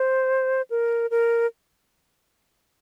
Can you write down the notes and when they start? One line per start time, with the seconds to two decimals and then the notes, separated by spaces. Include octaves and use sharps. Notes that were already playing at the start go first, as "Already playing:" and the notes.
Already playing: C5
0.70 A#4
1.11 A#4